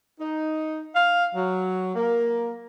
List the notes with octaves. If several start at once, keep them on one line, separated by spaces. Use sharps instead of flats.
D#4
F5
F#3
A#3